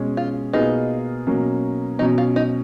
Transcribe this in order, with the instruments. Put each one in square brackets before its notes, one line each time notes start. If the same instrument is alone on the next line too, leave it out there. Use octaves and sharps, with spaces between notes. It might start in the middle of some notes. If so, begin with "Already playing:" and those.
Already playing: [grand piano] B2 G#3 C#4
[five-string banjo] F4
[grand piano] B2 A#3 F4 G#4 B4 [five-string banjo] D#4
[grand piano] B2 F#3 A#3 C#4
[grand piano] B2 F#3 C#4 [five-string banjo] D#4
[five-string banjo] F4
D#4